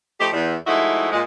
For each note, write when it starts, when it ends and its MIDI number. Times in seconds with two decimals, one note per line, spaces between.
0.19 0.29 53
0.19 0.29 57
0.19 0.29 63
0.19 0.29 67
0.33 0.56 40
0.67 1.09 53
0.67 1.09 56
0.67 1.09 57
0.67 1.09 63
0.67 1.09 64
0.67 1.09 66
1.12 1.22 46
1.12 1.22 56